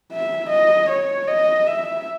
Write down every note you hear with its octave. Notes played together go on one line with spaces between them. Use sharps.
E5
D#5
C#5
D#5
E5